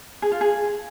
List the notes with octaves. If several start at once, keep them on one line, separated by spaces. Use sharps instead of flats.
G#4
F4
G#4